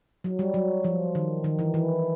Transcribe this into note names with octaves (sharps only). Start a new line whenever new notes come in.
F#3
G3
F#3
F3
D#3
D#3
E3
E3